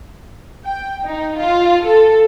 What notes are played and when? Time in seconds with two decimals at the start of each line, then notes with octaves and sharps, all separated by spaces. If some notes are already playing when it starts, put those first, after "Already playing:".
0.66 G5
1.06 D#4
1.38 F4
1.84 A4